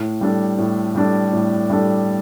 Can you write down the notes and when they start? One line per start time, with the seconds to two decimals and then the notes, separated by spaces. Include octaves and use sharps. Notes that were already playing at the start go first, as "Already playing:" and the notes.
Already playing: A2
0.21 G3 D4 A4
0.58 A2
0.95 G3 D4 A4
1.33 A2
1.70 G3 D4 A4